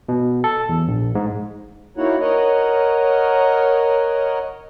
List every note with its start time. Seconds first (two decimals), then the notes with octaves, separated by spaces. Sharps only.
0.09 B2
0.44 A4
0.69 E2
0.88 A#1
1.15 G#2
1.97 A#3 D#4 E4 F#4 C#5 F#5
2.20 A#4 C#5 D#5 F#5